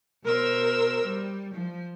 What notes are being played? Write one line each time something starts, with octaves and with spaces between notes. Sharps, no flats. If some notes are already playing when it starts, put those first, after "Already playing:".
B2 A#4 C5 E6
G3
F3